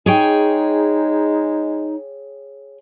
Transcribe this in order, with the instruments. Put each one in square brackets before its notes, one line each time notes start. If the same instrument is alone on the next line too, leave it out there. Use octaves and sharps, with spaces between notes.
[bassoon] G#3 [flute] D#4 [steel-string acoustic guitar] G#4 C#5 G5